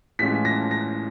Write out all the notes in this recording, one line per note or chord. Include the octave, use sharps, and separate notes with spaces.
A2 E3 G#3 C#4 F4 B6
A#6
A#6